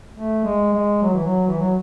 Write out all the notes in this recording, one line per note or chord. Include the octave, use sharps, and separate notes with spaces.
A3
G#3
G#3
F#3
E3
F#3
E3
F#3